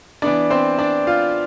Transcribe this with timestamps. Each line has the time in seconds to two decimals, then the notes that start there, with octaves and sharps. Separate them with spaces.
0.22 E3 B3 D4 D5
0.50 C4 C5
0.79 D4 D5
1.07 F4 F5